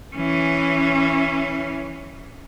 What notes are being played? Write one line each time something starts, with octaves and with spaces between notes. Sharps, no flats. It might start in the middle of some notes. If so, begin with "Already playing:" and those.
E3 C#4